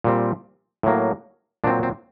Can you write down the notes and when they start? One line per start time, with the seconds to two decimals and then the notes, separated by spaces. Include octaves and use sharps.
0.04 A#2 G3 C4
0.83 A2 F#3 A#3
1.64 A#2 F#3 C4 D4
1.83 C4